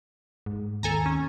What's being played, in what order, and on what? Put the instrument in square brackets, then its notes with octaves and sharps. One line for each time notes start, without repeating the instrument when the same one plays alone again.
[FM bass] G#2
[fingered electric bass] D#2 [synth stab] A4 G#5 A#5
[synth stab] C#4